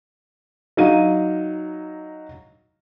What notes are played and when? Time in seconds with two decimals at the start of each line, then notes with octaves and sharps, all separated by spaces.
0.77 F#3 D#4 F5 D#7